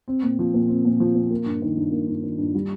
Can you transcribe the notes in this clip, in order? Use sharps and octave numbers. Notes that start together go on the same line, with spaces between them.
C4
A#2
F3
A#2
C4
A#2
F3
A#2
A#3
G2
D#3
G2
A#3
G2
D#3
G2
G3